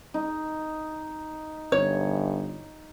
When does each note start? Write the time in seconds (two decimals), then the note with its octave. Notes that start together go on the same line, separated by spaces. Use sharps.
0.14 D#4
1.72 G1 C#5